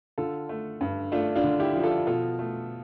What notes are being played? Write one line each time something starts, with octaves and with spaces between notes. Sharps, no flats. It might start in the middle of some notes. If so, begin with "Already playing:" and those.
D3 F4 A4
A3
G2
A3 D4 F4
D4 F4
D3
E4 G4
F3
F4 A4
B2 F4 A4
A3